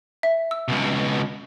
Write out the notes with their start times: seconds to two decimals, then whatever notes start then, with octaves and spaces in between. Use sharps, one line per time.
0.23 E5
0.51 E6
0.68 C#2 B2